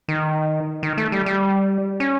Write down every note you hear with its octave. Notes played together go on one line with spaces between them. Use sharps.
D#3
D#3
A3
G3
G3
C#4